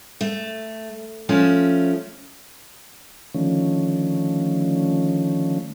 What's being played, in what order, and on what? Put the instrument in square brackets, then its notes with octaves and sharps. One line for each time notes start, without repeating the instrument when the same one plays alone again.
[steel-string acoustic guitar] A3
F3 A3 C#4
[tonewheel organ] D3 D#3 F3 A3 C#4